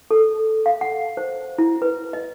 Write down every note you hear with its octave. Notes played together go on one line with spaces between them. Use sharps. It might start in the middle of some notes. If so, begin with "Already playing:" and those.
A4
F5
F#5
C5
E4
B4
D#5